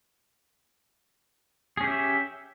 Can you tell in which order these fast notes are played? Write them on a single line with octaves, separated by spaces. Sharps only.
G#4 C#4 G4 E5